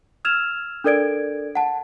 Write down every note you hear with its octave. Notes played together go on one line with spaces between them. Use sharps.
E6 F6 G#6 E7 F7
D4 A4 A#4 D5 G#6 D7
F#5 A5